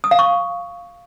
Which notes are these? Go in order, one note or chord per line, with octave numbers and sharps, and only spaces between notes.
D#6
F5
C#6